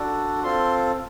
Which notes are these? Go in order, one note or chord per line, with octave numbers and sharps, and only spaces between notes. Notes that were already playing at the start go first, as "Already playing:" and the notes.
Already playing: D4 F#4 A4
C4 F4 A4 C6